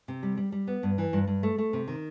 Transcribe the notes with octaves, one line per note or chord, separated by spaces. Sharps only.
C3
G3
G3
G3
B3
G2
E3
G2
G2
A3
A3
C3
D#3